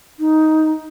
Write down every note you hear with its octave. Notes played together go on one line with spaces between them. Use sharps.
D#4